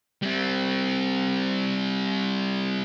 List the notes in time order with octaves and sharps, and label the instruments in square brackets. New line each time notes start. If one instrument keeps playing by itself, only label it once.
[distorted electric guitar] G3 C4